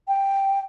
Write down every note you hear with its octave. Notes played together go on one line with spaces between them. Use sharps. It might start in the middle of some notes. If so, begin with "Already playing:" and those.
G5